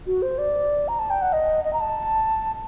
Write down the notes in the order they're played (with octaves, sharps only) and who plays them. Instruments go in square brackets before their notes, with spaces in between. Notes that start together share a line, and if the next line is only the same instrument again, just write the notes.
[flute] F#4
C5
D5
A#5
A5
G5
F#5
D#5
D#5
A#5
A5